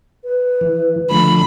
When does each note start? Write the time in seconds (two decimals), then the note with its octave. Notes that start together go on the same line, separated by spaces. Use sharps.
0.24 B4
0.61 E3
1.11 D3 F3 A3 B5